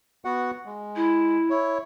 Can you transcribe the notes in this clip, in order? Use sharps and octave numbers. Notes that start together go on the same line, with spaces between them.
B3 F#4 F#5
G#3
E4
E4 C#5